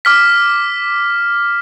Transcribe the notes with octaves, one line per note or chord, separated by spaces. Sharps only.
D6 F6 B6